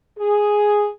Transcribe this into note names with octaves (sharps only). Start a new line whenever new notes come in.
G#4